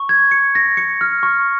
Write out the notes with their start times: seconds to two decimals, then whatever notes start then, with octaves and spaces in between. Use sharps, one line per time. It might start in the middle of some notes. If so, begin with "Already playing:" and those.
Already playing: C#6
0.09 G#6
0.31 C#7
0.55 A#6
0.77 C#7
1.01 F6
1.23 C#6